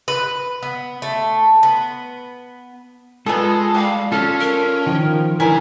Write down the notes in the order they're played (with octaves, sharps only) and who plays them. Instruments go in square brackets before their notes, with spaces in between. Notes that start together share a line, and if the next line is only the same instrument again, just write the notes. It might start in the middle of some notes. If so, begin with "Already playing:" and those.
[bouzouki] B4
B3
A3
B3
[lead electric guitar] G#3 [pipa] B3 G#4 [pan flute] F4 [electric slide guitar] A4
[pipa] G3 [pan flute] F5
[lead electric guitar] C#4 [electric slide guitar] F4 A4 [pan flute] F6
[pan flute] A#4
[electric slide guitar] D#3 F3
[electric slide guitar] E3 [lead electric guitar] D4 B4 [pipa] A#4 G#5